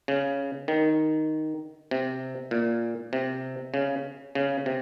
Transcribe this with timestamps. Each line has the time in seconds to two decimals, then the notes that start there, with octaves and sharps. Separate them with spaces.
0.08 C#3
0.68 D#3
1.91 C3
2.51 A#2
3.13 C3
3.74 C#3
4.35 C#3
4.66 C3